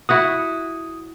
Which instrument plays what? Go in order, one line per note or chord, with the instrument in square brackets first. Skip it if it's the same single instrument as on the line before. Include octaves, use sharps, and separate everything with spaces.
[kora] E4 F#4 F#5 [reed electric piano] D#6